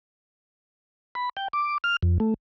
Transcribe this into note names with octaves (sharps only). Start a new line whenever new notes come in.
B5
G5
D6
F6
F2
A3